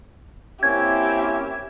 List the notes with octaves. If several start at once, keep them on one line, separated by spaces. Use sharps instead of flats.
A#3 C4 C#4 E4 G4 E5 G#6